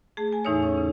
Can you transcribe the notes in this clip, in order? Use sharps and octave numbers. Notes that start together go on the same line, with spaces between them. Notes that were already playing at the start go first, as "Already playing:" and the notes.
A3 G#4
G#5
E2 A2 E3 D#4 E4 C#5
C#4
C#3